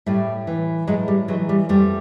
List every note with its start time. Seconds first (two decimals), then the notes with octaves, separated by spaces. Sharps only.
0.06 A2 G3 A3
0.47 E3
0.87 A2 F#3 G#3
1.08 G3
1.28 E3 F#3 G#3
1.49 G3
1.69 F2 G3 A3